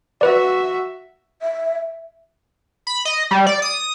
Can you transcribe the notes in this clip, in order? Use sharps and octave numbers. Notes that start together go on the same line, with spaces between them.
F#4 B4 D5 E5
E5
B5
D#5
G3
D5
D#6